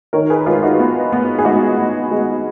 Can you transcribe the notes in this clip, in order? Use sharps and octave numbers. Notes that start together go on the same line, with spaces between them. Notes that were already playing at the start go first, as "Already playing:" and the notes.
D#3 A#4 C#5
G#4 B4
G#3 F4
D#4 F#4
B3
B3
G#4
G#3 D#4 F#4
B3
G#3